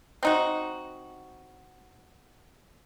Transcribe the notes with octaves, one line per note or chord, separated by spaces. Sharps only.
C4 D#4 F#4